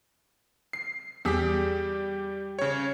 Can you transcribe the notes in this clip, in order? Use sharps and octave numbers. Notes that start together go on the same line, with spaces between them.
C7
E2 G3 G4 G#4 B6
C#3 C#5